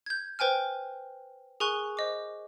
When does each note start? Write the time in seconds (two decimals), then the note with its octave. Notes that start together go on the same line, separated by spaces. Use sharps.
0.06 G6 G#6
0.39 B4 C5 G5 G#5 F6
1.60 G#4 A#4 G#5 C#6 F#6
1.97 C5 D#5 D6